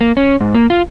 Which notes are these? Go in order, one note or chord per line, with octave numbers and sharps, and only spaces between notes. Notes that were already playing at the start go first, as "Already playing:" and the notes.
A#3
C#4
G#2
A#3
F4